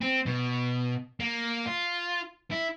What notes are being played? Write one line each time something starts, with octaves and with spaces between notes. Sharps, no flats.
C4
B2
A#3
F4
E4